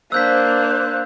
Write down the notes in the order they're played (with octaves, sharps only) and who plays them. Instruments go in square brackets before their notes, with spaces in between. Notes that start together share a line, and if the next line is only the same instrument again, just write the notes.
[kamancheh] A#3 D4 [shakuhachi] C5 [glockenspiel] E6 G6 B6 [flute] F#6